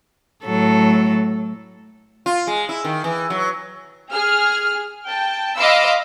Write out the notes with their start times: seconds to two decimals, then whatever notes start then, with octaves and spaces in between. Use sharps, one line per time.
0.44 A2 F#3 A4
2.26 F4
2.47 G#3
2.69 E4
2.84 D#3
3.04 E3
3.30 F#3
4.11 G#4 F6
5.08 G5 A5
5.57 D#5 F5 B5 C6 D6 E6